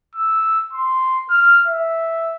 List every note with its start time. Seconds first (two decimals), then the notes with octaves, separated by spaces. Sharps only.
0.15 E6
0.73 C6
1.30 F6
1.67 E5